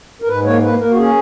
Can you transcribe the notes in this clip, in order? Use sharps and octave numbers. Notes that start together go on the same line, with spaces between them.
A#4
G#2 B4
A#3 C#5
A#3 B4
A#3 A#4
F#4
C#4 G#4